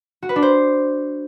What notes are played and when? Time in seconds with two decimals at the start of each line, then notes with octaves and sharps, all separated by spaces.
0.22 F#4
0.29 B4
0.36 D4
0.42 C5